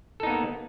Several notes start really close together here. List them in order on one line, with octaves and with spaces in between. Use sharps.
A4 D#4 B3 A#3